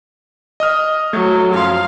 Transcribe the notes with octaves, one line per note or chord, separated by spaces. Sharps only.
D#5 D#6 F6
F#3 A3
F#2 F3 F5 C6